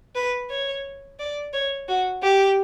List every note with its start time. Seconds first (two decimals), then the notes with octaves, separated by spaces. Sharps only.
0.15 B4
0.50 C#5
1.19 D5
1.53 C#5
1.88 F#4
2.23 G4